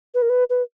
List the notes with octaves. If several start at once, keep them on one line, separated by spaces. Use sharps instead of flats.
B4
A#4
B4
B4